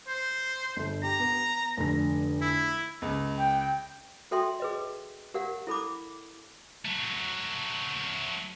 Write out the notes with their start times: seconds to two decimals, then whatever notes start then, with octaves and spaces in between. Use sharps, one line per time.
0.08 C5
0.76 G1 A4
1.03 G4 A#5
1.20 B3
1.77 F1 D3 A#6
2.41 E4
3.02 C#2
3.38 G5
4.31 F#4 A4 E5 G5 C6
4.60 G#4 B4 D#5
5.34 G4 A#4 F5 F#5
5.67 E4 A4 B5 D6
6.85 F#3 A3